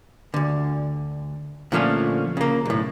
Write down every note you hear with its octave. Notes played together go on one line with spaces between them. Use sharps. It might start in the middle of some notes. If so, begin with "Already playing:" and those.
D2 D3
A#2 D3 F3 A3 C#4
C#3 A#3
B1 A2